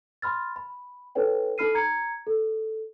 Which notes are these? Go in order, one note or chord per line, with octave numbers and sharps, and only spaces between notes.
B5 C6 F6 A6
B5
D#4 A4 B4 C#5 G5
D#4 A4 B5 F6 C7 D#7
A#5 G#6 C#7
A4